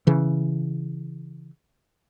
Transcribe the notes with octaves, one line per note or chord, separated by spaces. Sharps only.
C#3 E3